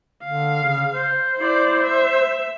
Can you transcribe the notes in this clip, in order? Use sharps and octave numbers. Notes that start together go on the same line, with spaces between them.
D3 F5
C#3
C5
E4 D5
E5